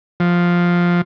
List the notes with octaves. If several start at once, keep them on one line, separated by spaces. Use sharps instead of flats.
F3